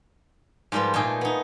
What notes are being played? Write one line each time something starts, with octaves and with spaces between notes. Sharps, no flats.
G#2 F3 G3 A#3 F4 B4
A#2 A3 D#4 G#4 G5
B3 D#4